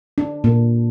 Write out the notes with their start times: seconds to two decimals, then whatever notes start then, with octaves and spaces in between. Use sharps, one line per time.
0.18 D4
0.44 A#2